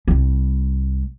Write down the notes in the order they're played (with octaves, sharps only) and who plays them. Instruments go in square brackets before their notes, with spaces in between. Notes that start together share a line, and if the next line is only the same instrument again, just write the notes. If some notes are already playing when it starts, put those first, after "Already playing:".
[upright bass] C2 G3